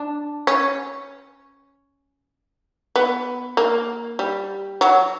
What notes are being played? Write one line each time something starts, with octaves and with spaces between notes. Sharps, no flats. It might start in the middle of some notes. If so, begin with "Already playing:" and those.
Already playing: D4
C#4
B3
A#3
G3
F#3